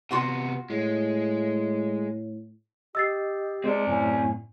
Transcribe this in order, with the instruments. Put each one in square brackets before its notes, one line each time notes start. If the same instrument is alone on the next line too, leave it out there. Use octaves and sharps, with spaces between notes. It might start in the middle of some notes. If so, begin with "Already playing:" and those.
[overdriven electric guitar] C3 B3 [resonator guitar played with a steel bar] F4 F#4 F#5
[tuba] A2 [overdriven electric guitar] G#3
[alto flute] G4 [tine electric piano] D#5 [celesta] E6 A6 C7
[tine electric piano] G#3 [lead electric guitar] C4 D5
[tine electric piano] F#2 A2 [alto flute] G#5